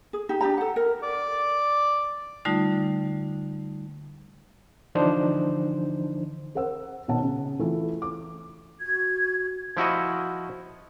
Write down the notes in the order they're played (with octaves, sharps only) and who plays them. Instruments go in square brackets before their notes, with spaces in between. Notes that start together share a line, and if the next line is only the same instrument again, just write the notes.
[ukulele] G#4
D#4 G4
D4 D#4 G4 A#5
A4 F#5
A#4
[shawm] D5
[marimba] D3 G3 A3 D#4 F4
[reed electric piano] D3 E3 F3 D4 D#4 C5
[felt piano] A#4 C5 F#5 E6
B2 D#3 C#5 F#5 A5
C#3
E3 A3 E4 F4
D6
[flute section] F#4 G#6
[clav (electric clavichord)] F3 E4 F#4 D#5